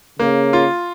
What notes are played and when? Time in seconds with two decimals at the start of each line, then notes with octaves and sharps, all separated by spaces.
0.19 C#3 A#3
0.53 F4